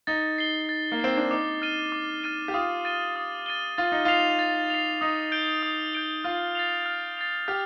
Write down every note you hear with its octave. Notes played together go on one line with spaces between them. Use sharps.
D#4 A6
C7 G7
A6
A#3
C4 C7 G7
D4
D#4 D6
F6 A6 D#7 G7
D6
F6 A6 D#7 G7
G4
F4 D#6
A6 D#7 G7
D#6
A6 D#7 G7
F4 A6
D#4
F4 C7 F7
A6
C7 F7
D#4 D#6
G6 D7 G7
D#6
G6 D7 G7
F4 F6
A6 C7 F7
F6
A6 C7 F7
G4 F6